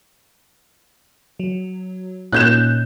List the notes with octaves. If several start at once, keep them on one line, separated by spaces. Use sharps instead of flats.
F#3
A#2 C#4 D#4 F#6 G6 E7